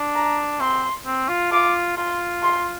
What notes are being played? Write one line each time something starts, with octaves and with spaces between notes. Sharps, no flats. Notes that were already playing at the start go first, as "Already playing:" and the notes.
Already playing: D4
A#5
C4 C6
C4
F4
F4 D6
F4 C6
C6